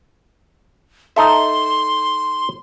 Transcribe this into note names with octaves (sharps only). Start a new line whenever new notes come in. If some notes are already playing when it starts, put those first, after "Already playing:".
D#4 A4 E5 C6